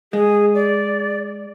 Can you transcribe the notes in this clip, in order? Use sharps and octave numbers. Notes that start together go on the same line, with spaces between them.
G#3 G#4
D5